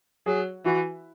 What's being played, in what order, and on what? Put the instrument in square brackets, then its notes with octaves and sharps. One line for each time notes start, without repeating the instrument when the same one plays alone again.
[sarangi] F#3 [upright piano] G#4
[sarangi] E3 [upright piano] F#4